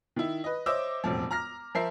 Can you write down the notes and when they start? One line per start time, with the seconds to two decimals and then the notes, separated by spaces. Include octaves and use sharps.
0.16 D#3 E4
0.44 B4 D#5
0.66 C5 C#5 D#5 E5 D6 E6
1.04 E1 F2 A2 F3
1.31 A#5 F6 A#6
1.75 F3 A#4 C5 E5 C7